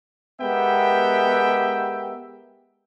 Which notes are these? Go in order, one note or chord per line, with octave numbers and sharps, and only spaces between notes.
G#3 B3 G4 A#4 E5 G5